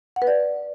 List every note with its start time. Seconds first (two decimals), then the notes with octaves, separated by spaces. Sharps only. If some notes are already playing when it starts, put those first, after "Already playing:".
0.16 F#5
0.22 B4
0.27 D5